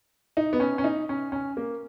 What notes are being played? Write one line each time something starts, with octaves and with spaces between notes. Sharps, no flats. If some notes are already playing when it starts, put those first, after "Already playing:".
D#4
B3
C#4
C#4
D#4
C#4
C#4
A#3